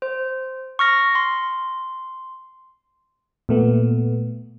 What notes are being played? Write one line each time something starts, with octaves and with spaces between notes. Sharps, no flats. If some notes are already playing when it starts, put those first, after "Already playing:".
C5
C#6 F6 A#6
C6
A#2 A3 B3